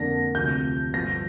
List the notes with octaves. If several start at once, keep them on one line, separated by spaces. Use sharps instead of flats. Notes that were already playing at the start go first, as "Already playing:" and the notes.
Already playing: F2 D3 A#3 A#6
D2 C3 F3 G6
G1 G2 F3 A#6